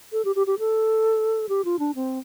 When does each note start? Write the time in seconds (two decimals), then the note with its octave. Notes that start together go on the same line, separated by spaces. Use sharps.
0.12 A4
0.25 G4
0.36 G4
0.47 G4
0.59 A4
1.49 G4
1.65 F4
1.79 D4
1.95 C4